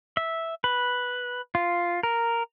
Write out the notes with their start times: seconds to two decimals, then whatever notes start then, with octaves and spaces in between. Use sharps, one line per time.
0.17 E5
0.64 B4
1.55 F4
2.03 A#4